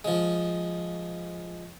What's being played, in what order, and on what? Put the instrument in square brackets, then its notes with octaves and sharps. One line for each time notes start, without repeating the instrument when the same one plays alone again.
[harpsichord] F3 G#3